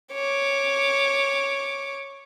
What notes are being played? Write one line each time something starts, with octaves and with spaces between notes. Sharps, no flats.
C#5 D6